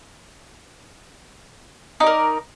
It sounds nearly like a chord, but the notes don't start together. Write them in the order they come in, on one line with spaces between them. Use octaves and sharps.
D#4 D5 A#4